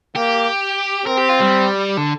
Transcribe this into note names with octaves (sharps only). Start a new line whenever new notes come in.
A#3 G4
C4 A#4
G4
F4
G3
D3